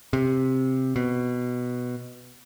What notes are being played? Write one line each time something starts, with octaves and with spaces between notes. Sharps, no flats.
C3
B2